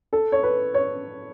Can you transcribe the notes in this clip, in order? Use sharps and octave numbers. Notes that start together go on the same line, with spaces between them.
A4
C#5
B4
C#5